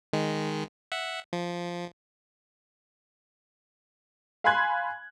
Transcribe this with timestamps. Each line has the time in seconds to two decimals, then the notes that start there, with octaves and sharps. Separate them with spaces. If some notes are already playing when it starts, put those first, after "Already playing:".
0.13 D#3 G#3
0.92 E5 F#5
1.33 F3
4.44 F5 G#5 B5 C6 F#6 G#6